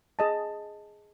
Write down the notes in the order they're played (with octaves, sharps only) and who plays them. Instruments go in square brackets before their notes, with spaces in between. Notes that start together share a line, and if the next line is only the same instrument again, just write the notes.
[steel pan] G#4 D#5 A5